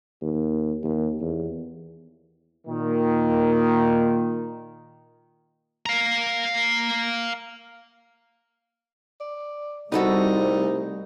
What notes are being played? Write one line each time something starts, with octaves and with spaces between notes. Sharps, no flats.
D#2
D#2
E2
A#2 D#3
F5 A#5
D5
C2 G3 A3 C4 D#4 F#4 A4 B4